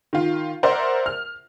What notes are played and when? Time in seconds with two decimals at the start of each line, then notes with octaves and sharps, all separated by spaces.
0.13 D#3 F4
0.63 A#4 C5 D5 E5 F#5
1.06 F6